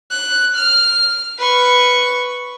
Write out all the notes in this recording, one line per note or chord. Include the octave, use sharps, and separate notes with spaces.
F#6
F6
B4 C#6